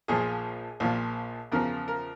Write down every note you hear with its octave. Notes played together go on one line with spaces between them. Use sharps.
A#1 A#2 F3 G#4
A#1 A#2 F3
E2 C#3 F3 A#4
A#4